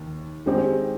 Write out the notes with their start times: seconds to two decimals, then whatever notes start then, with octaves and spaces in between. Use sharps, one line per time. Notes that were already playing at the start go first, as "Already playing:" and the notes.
Already playing: D#2
0.46 D#3 G#3 C4 D#4 G4